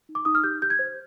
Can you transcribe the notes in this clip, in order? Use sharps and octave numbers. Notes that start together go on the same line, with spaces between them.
D#4
D6
D#4 D#6
F6
G4 G6
G4 G6
G#6
C5